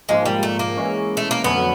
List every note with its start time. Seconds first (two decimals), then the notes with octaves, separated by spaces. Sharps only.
0.09 G#2 F3 G#3 A#3
0.26 G3
0.43 A3
0.59 A#3
0.77 E3 G#3 C#4
1.17 A3
1.31 A#3
1.44 F2 D3 F#3 A3 B3 C#4